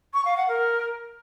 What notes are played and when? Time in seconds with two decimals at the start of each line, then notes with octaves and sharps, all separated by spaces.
0.14 C#6
0.25 F5
0.37 F#5
0.48 A#4